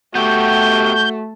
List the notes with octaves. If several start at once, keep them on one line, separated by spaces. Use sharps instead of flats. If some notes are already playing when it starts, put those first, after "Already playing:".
A3 B3 F#4 G4 G6